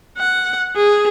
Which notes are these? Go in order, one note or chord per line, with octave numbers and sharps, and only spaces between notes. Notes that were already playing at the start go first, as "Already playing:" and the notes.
F#5
G#4